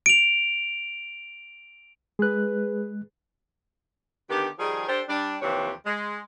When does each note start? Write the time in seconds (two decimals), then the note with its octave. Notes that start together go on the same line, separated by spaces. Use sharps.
0.06 D7 F7
2.19 G#3 G#4 B4 F#6
4.30 D3 D#3 B3 G4
4.59 D#3 F3 G3 G#4
4.88 D4 G4 A4 C5
5.09 G3 D4
5.42 D#2 C3 E3 F3 G4 C#5
5.86 G#3